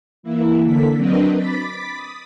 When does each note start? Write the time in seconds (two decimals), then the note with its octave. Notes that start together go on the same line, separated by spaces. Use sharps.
0.23 E3 A#3 E4
0.65 D3 A#3 A4 B6
0.96 F#3 C4 D4 A#4 B4 D#5
1.36 B5 D6 A6 B6
1.94 D#6